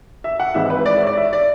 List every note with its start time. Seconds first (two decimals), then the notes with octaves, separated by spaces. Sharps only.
0.24 E5
0.40 F#5
0.54 G#1 G#2 E3 E5
0.70 B4
0.86 D5
0.96 E5
1.03 C#5
1.07 D5
1.17 E5
1.33 D5